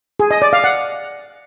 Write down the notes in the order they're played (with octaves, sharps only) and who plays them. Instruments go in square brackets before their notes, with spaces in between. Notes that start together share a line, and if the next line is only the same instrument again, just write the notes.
[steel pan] G#4
D#5
D5
F5
F#5